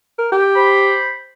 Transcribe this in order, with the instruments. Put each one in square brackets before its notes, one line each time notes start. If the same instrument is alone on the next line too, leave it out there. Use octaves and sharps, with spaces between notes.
[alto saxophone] A#4
G4
[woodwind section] C5 B5